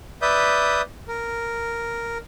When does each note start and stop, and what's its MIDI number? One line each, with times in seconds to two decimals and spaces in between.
0.22 0.82 71
0.22 0.82 74
0.22 0.82 76
0.22 0.82 87
0.22 0.82 91
1.08 2.18 70